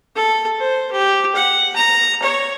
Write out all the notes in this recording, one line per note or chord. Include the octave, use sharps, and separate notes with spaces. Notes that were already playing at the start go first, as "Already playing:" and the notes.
A4
C5
G4
F#5
A#5
C#5